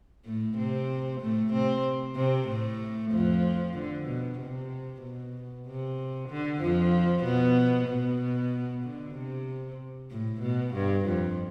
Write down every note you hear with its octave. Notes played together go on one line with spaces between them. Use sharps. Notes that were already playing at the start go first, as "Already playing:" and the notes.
A2 A3
C3 C4
A2 A3
C3 C4
C3 C4
A2 A3
F2 F3
D3
B2
C3
B2
C3
D3
F2 F3
B2 B3
B2 B3
D3
C3
A2
B2
G2
F2